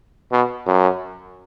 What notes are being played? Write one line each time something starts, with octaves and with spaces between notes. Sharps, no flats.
B2
F#2